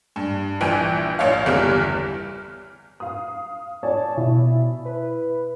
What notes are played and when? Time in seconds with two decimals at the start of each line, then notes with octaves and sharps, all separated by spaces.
0.16 G2
0.61 A#1 E3 G5 G#5
1.19 A#1 C#5 F5
1.46 G1 E2 E3 G3 G4 F6
3.00 F5 D#6
3.83 C#5 D5 G#5 A5
4.17 B2 E4
4.85 B4